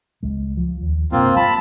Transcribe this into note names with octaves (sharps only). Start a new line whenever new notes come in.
C#2 G#3
F3
D#2
G2 C3 A#3 C4 F4
G3 A5 B5